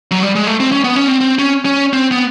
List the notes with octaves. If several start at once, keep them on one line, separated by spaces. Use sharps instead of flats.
F#3
G3
G#3
A3
C4
C#4
B3
C#4
C4
C4
C#4
C#4
C4
B3